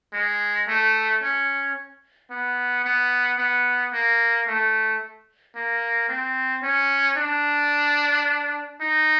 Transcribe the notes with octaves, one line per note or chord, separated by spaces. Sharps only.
G#3
A3
C#4
B3
B3
B3
A#3
A3
A#3
C4
C#4
D4
D#4